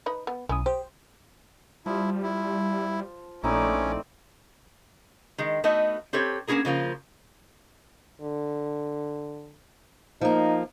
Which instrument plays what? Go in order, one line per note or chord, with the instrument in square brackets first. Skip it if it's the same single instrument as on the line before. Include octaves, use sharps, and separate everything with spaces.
[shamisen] D#4 B4 D#5
B3
[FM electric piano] B1 D#6 [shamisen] C#4 E4
[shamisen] G4 [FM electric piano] C5
[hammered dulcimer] F3 [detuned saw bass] G3 [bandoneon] E4
[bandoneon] E4
[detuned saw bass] A#1 [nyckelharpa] A3 D5 [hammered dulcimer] C4 D#4 E4 [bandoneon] C#4
[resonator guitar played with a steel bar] D#3 G#3
A3 B3 D#4 F#4 D#5 E5
C4 G4 A4 B4 C#5
A#3 B3 C#4 E4 G#4 A#4
C#3 F3 A#3 F4
[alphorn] D3
[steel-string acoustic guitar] F3 A#3 [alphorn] D#4